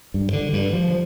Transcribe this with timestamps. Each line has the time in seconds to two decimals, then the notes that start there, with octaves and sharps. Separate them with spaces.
0.14 G2
0.33 D3
0.53 G2
0.73 F3